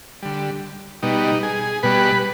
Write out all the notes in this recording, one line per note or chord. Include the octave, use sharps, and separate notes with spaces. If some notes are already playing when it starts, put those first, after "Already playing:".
D3 G3
B2 G3 D#4
G#4
B2 G3 B4